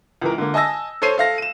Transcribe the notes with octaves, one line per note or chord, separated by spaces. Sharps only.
C#2 E3 A#4
D3 A#3
D#5 G#5 A5 E6 A#6
A4 C5 C#5 C7 D#7
A4 F5 A#6
D#7 E7